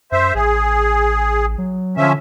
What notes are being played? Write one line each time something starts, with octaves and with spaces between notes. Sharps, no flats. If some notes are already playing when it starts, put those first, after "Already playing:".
F#2 C5 E5
A1 G#4
F#3
D3 F3 C#4 E5